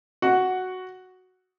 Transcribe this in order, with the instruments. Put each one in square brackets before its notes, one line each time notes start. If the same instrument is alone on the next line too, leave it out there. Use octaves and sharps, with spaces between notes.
[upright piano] F#4 F#5